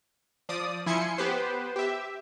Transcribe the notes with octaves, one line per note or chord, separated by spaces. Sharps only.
F3 D5 D#6
F3 E4 G#5 C6 C#7
B3 G4 B4 C5
G4 E5